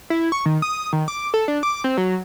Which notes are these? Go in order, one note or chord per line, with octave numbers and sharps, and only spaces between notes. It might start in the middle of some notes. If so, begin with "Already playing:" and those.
E4
C#6
D#3
D#6
D#3
D6
A4
D4
D6
C4
F#3